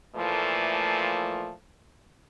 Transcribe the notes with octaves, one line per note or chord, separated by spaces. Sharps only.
A#2 E3 F3 A3